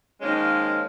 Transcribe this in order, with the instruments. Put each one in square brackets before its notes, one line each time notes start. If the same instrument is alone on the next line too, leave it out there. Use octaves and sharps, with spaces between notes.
[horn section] D#3 F3 G#3 A#3 C#4